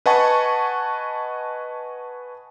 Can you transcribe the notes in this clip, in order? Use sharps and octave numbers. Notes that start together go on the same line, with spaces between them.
B4 D#5 F#5 G#5 A5 C#6